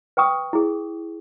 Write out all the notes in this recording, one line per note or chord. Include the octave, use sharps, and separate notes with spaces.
B4 G5 C#6 D#6
E4 G#4